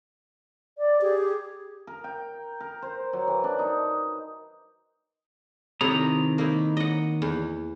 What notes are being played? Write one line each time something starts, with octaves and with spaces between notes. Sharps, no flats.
D5
G4 G#4
A#4
G5
A#4
C5
F#3
E3
D4
D#4
C3 D#3 E4 A4 A#5 D#6
A#3 D#4 E4
D#5 F#5
E2